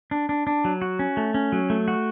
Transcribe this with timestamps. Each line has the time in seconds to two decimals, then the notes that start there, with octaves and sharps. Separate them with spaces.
0.11 D4
0.29 D4
0.47 D4
0.65 F#3
0.82 F#4
0.99 C#4
1.17 A3
1.34 C#4
1.52 F#3
1.70 A3
1.88 F#4